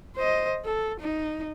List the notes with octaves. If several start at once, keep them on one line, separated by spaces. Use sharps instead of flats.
C5 D#5
A4
D#4